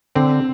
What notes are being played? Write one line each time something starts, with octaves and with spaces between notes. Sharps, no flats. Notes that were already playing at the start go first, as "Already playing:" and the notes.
D3 C4